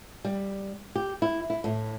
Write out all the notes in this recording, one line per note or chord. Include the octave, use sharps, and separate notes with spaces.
G3
G4
E4
E4
A2